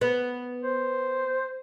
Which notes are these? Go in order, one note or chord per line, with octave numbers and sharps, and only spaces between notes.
B3
C5